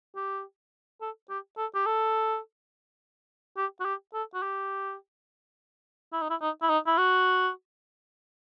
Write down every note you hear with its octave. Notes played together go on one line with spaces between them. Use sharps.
G4
A4
G4
A4
G4
A4
G4
F#4
G4
A4
F#4
G4
E4
D#4
E4
D#4
E4
D#4
E4
F#4